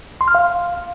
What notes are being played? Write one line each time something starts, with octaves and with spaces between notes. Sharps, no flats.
C6
F6
F5